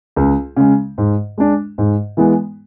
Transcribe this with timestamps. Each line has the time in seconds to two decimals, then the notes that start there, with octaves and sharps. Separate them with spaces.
0.16 C#2
0.56 C#3 G#3
0.98 G#2
1.38 G#3 D4
1.78 G#2
2.17 E3 G#3 B3